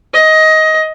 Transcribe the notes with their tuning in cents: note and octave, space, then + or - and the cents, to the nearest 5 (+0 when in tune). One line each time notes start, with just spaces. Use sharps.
D#5 +15